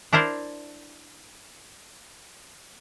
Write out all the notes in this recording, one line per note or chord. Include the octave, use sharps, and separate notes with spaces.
D4 E4 A#4 C5 D5